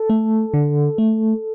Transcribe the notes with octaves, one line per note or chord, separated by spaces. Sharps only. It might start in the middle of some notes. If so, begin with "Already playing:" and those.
Already playing: A4
A3
D3
A3